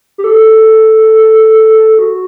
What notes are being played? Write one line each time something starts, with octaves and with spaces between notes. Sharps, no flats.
G4
A4
F#4